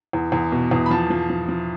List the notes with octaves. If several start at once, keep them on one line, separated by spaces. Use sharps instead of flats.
E2
E2
B2
E2
B5
F3 A5
F3
F3
F3